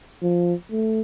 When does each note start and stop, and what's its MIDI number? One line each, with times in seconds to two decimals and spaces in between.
0.22 0.54 53
0.72 1.01 57